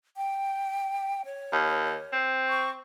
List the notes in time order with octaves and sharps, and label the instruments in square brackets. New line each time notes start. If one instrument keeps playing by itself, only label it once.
[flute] G5
C#5
[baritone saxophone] D#2
C4
[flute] C#6